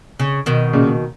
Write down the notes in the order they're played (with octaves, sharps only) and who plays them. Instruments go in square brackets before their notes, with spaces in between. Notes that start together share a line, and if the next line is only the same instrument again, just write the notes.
[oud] C#3
B2 D#3
[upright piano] A#2 C#3